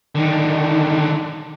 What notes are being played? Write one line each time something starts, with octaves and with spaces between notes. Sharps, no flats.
D3 D#3